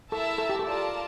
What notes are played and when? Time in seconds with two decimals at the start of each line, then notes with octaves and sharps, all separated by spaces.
0.12 E4 A4 A#4 E5 A5
0.38 A4
0.49 G4
0.59 A4
0.66 F4 A#4 D5 A5